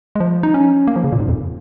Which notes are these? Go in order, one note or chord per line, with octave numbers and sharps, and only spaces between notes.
G#3
F3
D#4
C#4
A#3
F3
C#3
A#2
G#2
F2